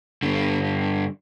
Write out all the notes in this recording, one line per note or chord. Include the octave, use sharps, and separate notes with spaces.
G2 D3